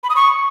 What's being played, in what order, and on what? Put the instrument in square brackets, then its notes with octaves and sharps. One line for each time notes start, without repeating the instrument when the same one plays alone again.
[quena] B5
D#6
C#6